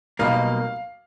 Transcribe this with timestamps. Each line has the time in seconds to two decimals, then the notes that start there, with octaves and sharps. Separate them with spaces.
0.19 B1 B2 G3 A#3 D#4 F5